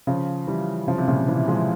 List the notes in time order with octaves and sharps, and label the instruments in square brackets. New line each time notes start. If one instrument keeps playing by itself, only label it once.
[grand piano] C#3 F3
E3 G3
C#3 F3
C3
A#2 C#3
C3 E3
F3 G#3